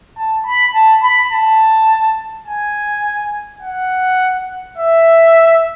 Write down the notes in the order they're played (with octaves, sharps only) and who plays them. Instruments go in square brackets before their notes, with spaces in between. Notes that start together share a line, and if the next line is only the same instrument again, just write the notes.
[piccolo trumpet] A5
B5
A5
B5
A5
G#5
F#5
E5